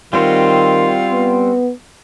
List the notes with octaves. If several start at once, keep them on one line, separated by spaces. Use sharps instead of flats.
D#3 G3 C4 F4 F#4
B3